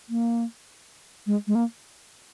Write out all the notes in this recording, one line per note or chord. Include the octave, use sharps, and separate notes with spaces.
A#3
G#3
G#3
A#3